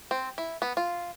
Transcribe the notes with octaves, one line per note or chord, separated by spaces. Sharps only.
C4
E4
B3
F4